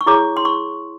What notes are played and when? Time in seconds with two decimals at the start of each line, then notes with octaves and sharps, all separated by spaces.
0.01 C#6
0.06 E4 G#4 C#5 D6
0.37 C6
0.45 C#6